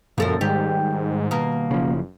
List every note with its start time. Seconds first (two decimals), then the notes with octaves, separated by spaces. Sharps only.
0.18 G#1 C#2 F#2 A#2 F3 A4 A#4
0.41 G#2 D#3 G3 G4
1.31 B2 A#3
1.71 F#1 C#3 F3